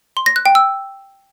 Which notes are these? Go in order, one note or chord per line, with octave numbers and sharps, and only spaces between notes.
C6
A#6
F#6
G5
E6